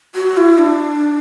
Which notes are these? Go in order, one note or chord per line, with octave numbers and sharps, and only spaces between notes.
F#4
E4
D4